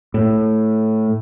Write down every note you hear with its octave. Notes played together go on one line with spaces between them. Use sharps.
A2